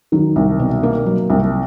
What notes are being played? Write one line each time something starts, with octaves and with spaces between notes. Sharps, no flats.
D#3 F#3
C2
B2
A#3
F#3
C2